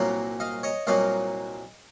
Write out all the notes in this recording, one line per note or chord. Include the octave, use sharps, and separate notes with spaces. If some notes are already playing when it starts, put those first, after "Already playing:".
Already playing: C2 A#2 F#3 A#3
D#5 F5
C#5 D#5
C2 A#2 F#3 A#3 D#5 F5